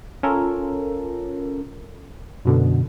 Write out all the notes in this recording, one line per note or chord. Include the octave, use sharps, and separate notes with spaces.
C#4 F4 A4 A#4
F#2 B2 D3